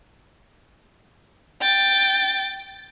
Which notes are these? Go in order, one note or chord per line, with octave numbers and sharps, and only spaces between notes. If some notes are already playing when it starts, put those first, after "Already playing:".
G5 A6